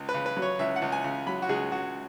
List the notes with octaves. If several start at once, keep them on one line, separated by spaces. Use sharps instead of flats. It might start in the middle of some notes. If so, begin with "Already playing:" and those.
Already playing: C#2
B4
C#3
B4
F#3
C#5
C#2 E5
F#5
C#2
G#5
C#3
F#3 B5
F#4
C#2 G#4
C#2 F#4